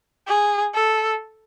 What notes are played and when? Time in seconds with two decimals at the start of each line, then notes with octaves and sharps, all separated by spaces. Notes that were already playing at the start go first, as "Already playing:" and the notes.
0.27 G#4
0.74 A4